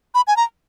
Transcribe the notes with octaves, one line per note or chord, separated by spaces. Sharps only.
B5
G#5
A#5